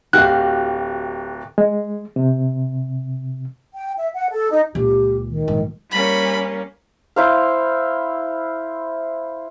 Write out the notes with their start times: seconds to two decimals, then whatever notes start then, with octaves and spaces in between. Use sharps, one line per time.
0.13 D1 F#4 G4 F5 F#6
1.58 G#3
2.16 C3
3.73 G5
3.98 E5
4.14 F#5
4.30 A4
4.50 D#4
4.75 C#2 A#2 G4
5.29 D#3
5.48 A#1 G#2
5.92 G3 A#3 C#4 B5
7.16 E4 C5 F5